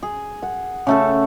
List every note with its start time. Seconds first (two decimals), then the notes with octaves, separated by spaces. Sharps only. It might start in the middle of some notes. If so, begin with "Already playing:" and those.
0.03 G#4
0.43 F#5
0.87 C#3 A3 A4